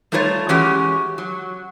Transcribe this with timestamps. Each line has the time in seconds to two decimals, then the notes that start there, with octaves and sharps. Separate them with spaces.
0.12 G3 A3 D#4 F4 C5 C#5
0.49 E3 G#3 C#4 F#4 G4
1.18 F#3